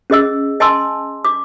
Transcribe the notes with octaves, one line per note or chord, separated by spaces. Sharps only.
C#4 G#4 D#5 E6
D#5 G#5 A5 C6 E6
D6